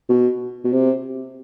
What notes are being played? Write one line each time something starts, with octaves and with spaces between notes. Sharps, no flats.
B2
B2
C3